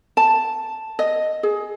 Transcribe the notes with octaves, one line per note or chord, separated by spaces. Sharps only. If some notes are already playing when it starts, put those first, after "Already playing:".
A5
D#5
G#4